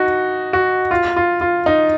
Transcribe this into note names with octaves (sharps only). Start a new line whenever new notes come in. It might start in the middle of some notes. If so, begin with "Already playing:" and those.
Already playing: D#4 F#4
F#4
F4
F4
F4
D#4